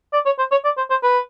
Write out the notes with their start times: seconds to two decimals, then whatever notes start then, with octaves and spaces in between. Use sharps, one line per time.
0.13 D5
0.25 C#5
0.38 C5
0.51 C#5
0.64 D5
0.77 C5
0.90 C5
1.03 B4